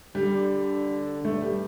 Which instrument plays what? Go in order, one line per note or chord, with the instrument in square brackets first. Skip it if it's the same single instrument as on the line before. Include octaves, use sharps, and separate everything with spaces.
[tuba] D3 [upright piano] G3
[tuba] G2 [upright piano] A3
[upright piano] G3